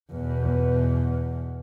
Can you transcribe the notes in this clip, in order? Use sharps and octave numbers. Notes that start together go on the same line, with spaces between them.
E2 B2